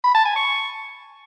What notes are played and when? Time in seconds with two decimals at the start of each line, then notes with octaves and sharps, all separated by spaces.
0.04 B5
0.15 A5
0.25 G#5
0.36 C#6